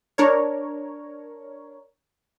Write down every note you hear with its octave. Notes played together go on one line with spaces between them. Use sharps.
D4 A#4 C#5